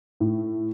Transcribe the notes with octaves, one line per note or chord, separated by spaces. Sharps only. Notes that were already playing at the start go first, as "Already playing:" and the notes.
A2